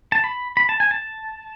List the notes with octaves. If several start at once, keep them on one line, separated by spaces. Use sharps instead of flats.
A5
B5
B5
A5
G#5
A5